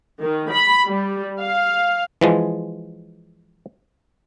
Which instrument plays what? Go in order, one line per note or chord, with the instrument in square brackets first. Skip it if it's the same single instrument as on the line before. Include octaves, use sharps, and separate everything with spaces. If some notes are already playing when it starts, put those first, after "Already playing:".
[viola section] D#3
B5
G3
F5
[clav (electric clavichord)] E3 F3 G#3